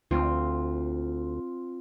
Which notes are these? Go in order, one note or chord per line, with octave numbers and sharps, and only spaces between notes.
D2 C4 F4